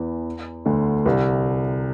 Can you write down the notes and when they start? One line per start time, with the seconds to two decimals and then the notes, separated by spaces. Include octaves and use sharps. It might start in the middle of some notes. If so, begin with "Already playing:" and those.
Already playing: E2 E3
0.66 D2 D3
1.05 C2 C3